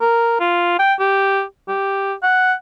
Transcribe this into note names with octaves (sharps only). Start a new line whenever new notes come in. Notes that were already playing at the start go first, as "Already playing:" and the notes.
A#4
F4
G5
G4
G4
F#5